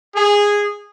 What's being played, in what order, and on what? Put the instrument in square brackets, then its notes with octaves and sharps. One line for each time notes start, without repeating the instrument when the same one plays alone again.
[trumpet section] G#4